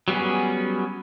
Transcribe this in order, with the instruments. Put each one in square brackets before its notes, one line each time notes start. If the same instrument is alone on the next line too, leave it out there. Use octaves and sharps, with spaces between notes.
[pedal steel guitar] F#3 G3 B3 C#4 G#4